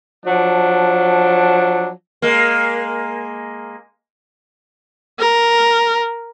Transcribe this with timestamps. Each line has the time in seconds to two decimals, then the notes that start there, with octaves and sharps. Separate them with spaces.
0.24 F3 F#3 D4
2.22 G#3 A#3
5.20 A#4